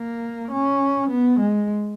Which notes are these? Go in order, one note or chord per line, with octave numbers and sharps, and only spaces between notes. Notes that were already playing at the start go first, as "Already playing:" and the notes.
Already playing: A#3
C#4
B3
G#3